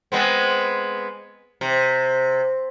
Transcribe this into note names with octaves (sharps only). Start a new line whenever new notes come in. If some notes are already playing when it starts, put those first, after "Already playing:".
G#3 B3 C4
C3